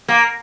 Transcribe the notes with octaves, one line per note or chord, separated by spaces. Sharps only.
A#3